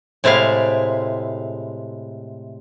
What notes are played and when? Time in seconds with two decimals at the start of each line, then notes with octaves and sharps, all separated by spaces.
0.24 A2 C3 G#3 E4 F5